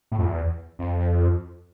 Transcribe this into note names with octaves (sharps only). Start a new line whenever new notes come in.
A2
F2
E2
F2